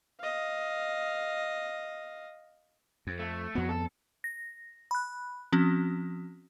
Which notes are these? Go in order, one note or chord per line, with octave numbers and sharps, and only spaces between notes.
D#5 F5
F2
A3
F2 F#3 B3
A4
A#6
B5 F#6
F3 C4 C#4 F#4